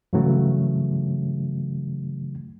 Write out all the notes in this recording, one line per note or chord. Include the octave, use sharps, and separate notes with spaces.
G2 C#3 E3 F#3 A3